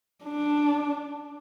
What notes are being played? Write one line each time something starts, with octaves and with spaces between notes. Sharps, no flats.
D4